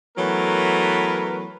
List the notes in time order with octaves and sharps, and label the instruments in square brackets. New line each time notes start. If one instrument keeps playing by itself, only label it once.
[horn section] E3 F#3 A3 B3 A#4 B4